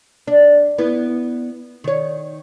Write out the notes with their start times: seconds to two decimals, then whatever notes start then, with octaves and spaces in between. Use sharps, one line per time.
0.28 D4
0.78 B3 E4
1.84 D#3 C#5